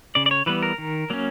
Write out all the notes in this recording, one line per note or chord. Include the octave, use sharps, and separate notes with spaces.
C#3 D5
D5
C#5
E3 G3 B3 B4
A#4
D#3
F#3 A#3 C#4